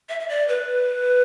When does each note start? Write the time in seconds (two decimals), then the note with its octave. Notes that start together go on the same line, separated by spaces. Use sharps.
0.09 E5
0.20 E5
0.29 D5
0.48 B4